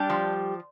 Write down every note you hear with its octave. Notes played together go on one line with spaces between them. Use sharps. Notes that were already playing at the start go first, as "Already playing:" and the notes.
Already playing: G3 D4 G4
F3